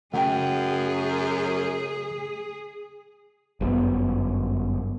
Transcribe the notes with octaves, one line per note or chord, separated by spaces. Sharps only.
F#2 C#3 A3 G#4 F#5 G5
G1 F#2 A2 B3